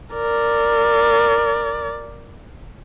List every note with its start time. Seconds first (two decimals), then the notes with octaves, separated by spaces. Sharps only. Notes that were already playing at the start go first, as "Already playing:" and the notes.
0.13 A#4 D5